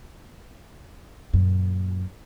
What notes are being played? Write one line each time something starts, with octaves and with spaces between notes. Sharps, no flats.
F#2 A#2